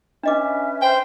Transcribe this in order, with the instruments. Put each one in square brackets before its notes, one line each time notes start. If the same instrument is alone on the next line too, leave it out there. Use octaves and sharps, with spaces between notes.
[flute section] C#4 B4 E5 [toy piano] D4 D#5 D6
[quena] C5 [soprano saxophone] G5